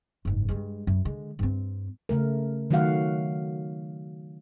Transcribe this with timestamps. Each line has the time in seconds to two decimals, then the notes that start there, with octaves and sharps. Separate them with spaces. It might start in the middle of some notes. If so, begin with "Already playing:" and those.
0.25 F#1 G#2
0.49 G2 G#3
0.87 F#2
1.05 D3 G#3
1.39 G2 C4
2.09 C#3 A3 A#4
2.71 D#3 F#3 A3 F#4 F5 F#5